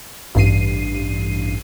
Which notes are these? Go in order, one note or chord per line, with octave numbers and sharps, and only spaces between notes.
A1 G2 C7 D#7